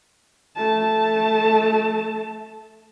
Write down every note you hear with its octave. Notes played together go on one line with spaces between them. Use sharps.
A3 A5